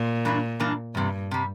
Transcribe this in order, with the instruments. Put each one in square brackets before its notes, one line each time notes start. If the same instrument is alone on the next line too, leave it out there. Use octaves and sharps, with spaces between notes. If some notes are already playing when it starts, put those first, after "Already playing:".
Already playing: [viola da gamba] A#2
[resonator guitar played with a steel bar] G2 E3 A#3 D4
G2 E3 A#3 D4
[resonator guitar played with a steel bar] E2 C3 G3 [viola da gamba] G2
[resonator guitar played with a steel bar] C3 G3